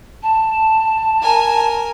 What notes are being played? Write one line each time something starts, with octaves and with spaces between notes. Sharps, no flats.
A5
A#4 G#5